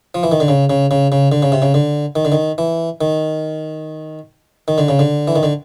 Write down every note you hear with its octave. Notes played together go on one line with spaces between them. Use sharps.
F3
E3
D#3
D3
C#3
C#3
C#3
C#3
D3
C#3
C3
C#3
D3
D#3
D3
D#3
E3
D#3
D#3
D3
C#3
D3
E3
D#3
D3